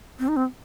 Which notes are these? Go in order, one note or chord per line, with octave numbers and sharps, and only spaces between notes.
C4
D#4
C4